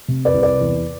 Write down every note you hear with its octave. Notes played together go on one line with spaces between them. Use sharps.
C3
B4 D5
C2
B4 D5
E2